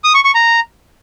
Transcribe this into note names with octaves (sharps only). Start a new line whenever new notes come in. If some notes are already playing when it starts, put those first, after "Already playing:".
D#6
C#6
C#6
A#5